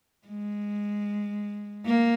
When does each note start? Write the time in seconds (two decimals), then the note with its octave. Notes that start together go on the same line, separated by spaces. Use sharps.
0.28 G#3
1.85 A#3